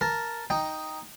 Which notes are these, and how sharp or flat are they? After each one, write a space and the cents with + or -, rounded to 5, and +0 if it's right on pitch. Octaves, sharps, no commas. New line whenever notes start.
A#4 +0 A5 +0
D#4 +0 G5 +0